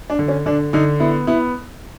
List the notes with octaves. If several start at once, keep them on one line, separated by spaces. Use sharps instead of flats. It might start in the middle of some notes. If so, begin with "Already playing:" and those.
D4
D3
C#4
D3 D4
D3 D#4
B3 E4
B3 E4